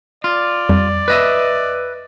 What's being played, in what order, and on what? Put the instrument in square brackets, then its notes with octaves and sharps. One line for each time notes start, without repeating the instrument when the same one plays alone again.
[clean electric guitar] F4 [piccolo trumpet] D5
[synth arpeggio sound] F2 G3
[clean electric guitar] B4 D#5 E5